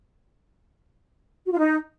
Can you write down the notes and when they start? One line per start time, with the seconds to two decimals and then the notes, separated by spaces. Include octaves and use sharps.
1.46 F#4
1.52 F4
1.58 D#4